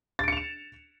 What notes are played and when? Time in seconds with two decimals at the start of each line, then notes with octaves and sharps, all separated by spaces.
0.19 A6
0.23 D7
0.28 C#7
0.32 F7
0.37 E7